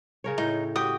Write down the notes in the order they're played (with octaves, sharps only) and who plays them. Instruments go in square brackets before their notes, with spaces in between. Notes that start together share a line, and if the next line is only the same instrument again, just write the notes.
[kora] C#3 A#4 C#5
[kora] A2 [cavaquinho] D#4
[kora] F#4 G4 G5 [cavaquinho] D#6